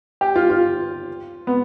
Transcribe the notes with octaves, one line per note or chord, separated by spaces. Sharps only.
G4
F4
F4
B3